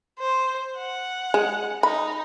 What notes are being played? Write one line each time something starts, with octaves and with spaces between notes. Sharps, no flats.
C5
F#5
G#3
D#4 B5